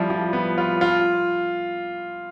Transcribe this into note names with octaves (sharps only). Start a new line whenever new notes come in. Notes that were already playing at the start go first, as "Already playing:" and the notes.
Already playing: F3 G3 E4
F3
B3
F4
F4